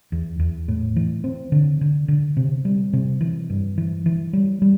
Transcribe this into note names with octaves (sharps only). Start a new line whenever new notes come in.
E2
E2
A2
E3
C4
D3
D3
D3
C3
G3
C3
E3
G2
E3
E3
G3
G3